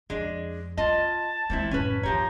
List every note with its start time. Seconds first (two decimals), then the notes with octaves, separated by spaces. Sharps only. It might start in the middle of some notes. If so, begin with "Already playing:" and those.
0.10 F2 G#3 D4
0.77 B3 F4 D#5 A5
1.50 A#2 E3 G#3 C4 E4
1.71 F#1 A2 C#4 B4
2.03 D#2 F3 G4 C#5 A#5